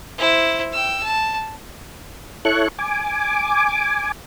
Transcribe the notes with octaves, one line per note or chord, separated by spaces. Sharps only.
E4 C5
G5 E6
A5
E4 A4 C#5 C#6 F#6
G#5 D6